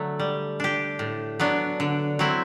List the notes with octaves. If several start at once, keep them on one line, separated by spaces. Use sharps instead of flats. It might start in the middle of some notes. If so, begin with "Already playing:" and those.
Already playing: D3 F#3 A3
G3
D4 G4
A2
F#3 B3 D4
D3
F#3 C4 E4